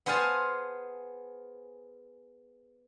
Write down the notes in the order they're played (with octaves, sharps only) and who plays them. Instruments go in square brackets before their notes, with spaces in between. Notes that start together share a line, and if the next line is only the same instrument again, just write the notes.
[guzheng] B3 G#4 C5 F5 G#5 A5